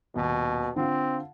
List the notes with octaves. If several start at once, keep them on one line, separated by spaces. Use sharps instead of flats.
D#1 B2
D3 C4 F4